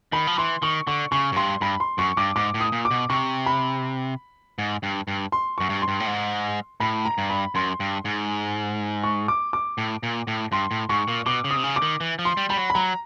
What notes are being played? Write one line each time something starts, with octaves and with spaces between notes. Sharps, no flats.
D#3 B5
F3
E3 C6
D#3 C#6
D3 C#6
C#3 C#6
F#2
G2 C6
G2 B5
C6
F#2 C#6
G2 D6
G#2 D6
A2
D#6
A#2
D6
B2
C3 C#6
B5
G#2
G2
G2
C6
F#2 C#6
G2
C6
G2
A2
G#2
A2 B5
A#5
G2
B5
F#2 C6
G2
G#2
C#6
D6
D6
A2
A#2
A2
G2 C6
A2
G#2 C#6
A#2
B2 D6
C#3
D#6
C3
C#3
D6
D#3
E3
F3
C6
G3
G3 B5
F#3
B5
F#3 A#5